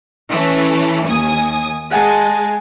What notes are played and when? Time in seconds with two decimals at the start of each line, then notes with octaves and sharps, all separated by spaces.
0.30 E3 A3 C#4
1.06 D#2 G#5 D#6
1.91 G#3 F#5 G#5 A5